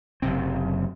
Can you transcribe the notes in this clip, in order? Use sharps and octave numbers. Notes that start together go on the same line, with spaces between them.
F#1 F#2 C3 C4